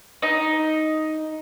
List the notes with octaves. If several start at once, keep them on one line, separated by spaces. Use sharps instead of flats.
D#4 D#5